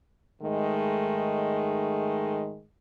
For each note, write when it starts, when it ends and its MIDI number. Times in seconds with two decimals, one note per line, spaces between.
0.42 2.64 44
0.42 2.64 51
0.42 2.64 56
0.42 2.64 57